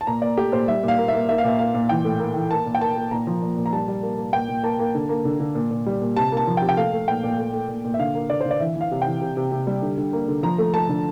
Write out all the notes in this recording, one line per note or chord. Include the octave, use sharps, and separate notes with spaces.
A5
A#2 A#5
A#2 D5
A3 G4
A#2 C5
G3 E5
A#2 F5
A#3
E5
A#3
A#3 E5
F5
A#2 E5
A#3 F5
A#2
E3 G5
A2
A#3
E3
A#3 A5
A#2
G5
A#3 A5
A#3
A#2 A#5
F3
A#2
A#2
A#5
G3 A5
G3
A#3
A#3
A#2 G5
A#2
A#3 A5
A#3
D3
A#3
D3
D3
A#2
A#2
G3
A#2
C3 A5
A#3 A5
F3
G5
C3
G5
A3 F5
A3
A#2 G5
A#2
A3
A3
A#2
A#2
E5
D3 F5
A#3
D3 D5
C5
D3
D5
E3 E5
E3
F5
C3
E3 G5
C3
C3
C3
G3
D3
D3
A#3
D3
F3 A#5
A3
A3 A5
D3